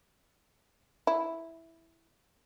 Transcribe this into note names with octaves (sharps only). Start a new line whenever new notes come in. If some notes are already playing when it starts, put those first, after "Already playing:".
E4